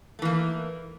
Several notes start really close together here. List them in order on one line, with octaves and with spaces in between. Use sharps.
A3 E3 A#3